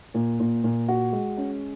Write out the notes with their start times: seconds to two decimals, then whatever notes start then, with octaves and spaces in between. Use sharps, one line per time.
0.14 A#2
0.40 A#2
0.64 A#2
0.88 F#4
1.13 G#3
1.37 C#4